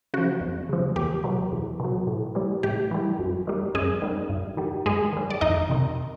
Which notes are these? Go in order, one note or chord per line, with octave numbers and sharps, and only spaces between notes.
C#3 F3 F#4
F2
C#3 F3
E2 G4
B2 F#3
E2
B2 F#3
A2
E3 G3
A2 G4
E3 G3
F#2
D#3 G3
F#2 G#3 G#4
D#3 G3
G2
D#3 G3
G2 G#3 G#4
D#3 G3
D5
F2 D#4 D#5
C3 D#3